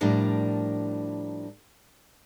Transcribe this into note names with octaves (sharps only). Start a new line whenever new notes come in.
A2 F3 G3 D4 A#4 A#5